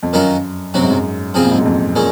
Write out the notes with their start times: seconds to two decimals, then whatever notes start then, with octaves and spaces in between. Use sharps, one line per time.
0.03 F2
0.13 F#2 D#3 F#3 C#4 F4 A#4
0.74 F#2 C3 F#3 C4 F#4
0.82 G#2
0.90 F#2
1.34 C3 F3 C4 F4 G#4
1.44 A#2
1.51 G#2
1.58 F#2
1.65 F2
1.95 A#2 G#3 C#4